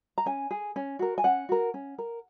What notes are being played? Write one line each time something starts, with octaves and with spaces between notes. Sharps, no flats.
A#5
C#4 G#5
G#4
C#4
F#4 A#4
G#5
C#4 F#5
F#4 A#4
C#4
A#4